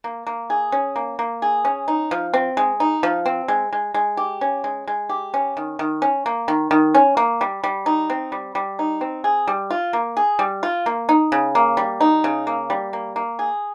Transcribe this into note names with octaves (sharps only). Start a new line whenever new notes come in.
A#3
A#3
G#4
C#4
A#3
A#3
G#4
C#4
D#4
F3
C4
G#3
D#4
F3
C4
G#3
G#3
G#3
G4
C#4
G#3
G#3
G4
C#4
D#3
D#3
C#4
A#3
D#3
D#3
C#4
A#3
G3
G3
D#4
C4
G3
G3
D#4
C4
G#4
G3
F4
A#3
G#4
G3
F4
A#3
D#4
C#3
A#3
G3
D#4
C#3
A#3
G3
A#3
A#3
G#4